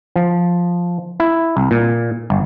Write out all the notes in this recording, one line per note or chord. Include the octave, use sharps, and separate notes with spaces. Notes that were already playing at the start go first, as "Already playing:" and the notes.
F3
E4
C2
A#2
G1